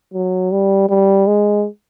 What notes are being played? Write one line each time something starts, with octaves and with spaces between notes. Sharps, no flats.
F#3
G3
G3
G#3